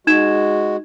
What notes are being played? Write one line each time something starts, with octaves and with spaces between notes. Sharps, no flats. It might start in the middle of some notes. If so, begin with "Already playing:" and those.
G#3 D#4 F#4 G#6 E7